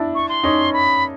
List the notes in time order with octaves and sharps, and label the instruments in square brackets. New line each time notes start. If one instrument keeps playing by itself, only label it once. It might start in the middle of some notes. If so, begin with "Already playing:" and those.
Already playing: [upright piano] D4 E4
[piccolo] C#6
C6
[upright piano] C#4 D#4
[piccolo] B5